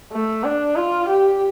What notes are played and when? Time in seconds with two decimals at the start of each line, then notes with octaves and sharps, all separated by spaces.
0.12 A3
0.44 D4
0.76 F4
1.08 G4